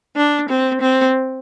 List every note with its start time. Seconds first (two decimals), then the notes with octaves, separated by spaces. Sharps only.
0.16 D4
0.49 C4
0.81 C4